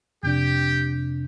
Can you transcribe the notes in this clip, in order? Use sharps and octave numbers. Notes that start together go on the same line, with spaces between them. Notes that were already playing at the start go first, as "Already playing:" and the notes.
F2 C3 D4 G4 G5